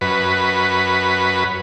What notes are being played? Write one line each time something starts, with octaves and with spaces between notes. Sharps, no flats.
F#2 B4